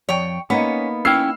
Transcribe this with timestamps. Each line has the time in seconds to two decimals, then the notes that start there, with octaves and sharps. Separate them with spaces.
0.09 F2 C#5 G5
0.50 A#3 B3 C#4 D#4
1.05 C#4 E4 G5 E6 F6 C7